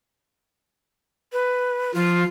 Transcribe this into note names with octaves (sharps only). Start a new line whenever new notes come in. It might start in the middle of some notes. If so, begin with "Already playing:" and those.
B4
F3 F4